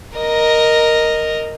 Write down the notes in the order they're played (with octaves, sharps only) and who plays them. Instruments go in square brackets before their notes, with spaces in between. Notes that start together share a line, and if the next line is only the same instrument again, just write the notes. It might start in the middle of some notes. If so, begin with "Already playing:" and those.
[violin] A#4 D#5